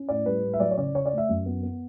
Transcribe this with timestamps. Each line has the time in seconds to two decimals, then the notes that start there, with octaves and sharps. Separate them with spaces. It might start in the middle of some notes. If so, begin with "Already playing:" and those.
Already playing: C#4
0.09 A2 D5
0.26 G3 B4
0.43 A2
0.53 E5
0.60 F#3 D5
0.71 C#5
0.77 C#3 D5
0.94 C#3 C#5
1.06 D5
1.12 A3
1.18 E5
1.29 F#2
1.46 B3
1.63 B3